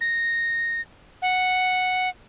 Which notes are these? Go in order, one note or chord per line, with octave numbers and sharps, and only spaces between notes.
A#6
F#5